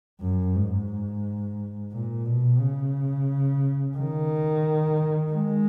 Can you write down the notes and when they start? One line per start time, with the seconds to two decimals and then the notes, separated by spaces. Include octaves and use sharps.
0.21 F#2
0.56 G#2
1.93 A#2
2.26 B2
2.60 C#3
3.97 D#3
5.33 G#3